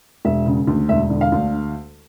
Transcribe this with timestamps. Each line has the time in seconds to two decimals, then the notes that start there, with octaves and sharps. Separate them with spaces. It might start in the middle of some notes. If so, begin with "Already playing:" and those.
0.25 E1 E5
0.46 C#3
0.67 D2
0.89 E1 E5
1.10 D3
1.21 F5
1.32 D2